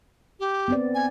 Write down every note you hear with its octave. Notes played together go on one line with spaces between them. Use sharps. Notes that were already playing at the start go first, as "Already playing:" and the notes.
G4
B3 C4 D5
G#5